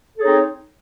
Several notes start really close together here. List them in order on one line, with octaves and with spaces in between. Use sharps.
A4 G#4 C#5 D#4 C4